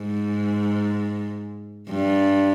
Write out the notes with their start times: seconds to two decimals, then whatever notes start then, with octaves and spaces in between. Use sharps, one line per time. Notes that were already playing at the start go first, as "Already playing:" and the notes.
Already playing: G#2
1.91 G2